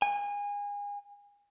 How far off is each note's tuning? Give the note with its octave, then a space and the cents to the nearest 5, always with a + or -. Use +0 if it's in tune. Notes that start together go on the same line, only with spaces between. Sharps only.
G#5 -30